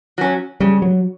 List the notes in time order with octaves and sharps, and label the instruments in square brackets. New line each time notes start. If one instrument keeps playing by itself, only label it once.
[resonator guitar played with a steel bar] F#3 C#4
[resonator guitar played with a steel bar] C#3 [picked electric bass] G3
[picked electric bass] F#3